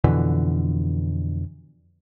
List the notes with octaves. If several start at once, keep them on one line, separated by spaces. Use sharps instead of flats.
F2 B2 D3 E3